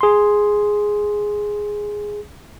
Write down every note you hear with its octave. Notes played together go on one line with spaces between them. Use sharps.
G#4 C6